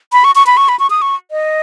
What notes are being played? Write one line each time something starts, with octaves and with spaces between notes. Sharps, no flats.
B5
C#6
C#6
B5
C#6
B5
C#6
D#6
C#6
D#5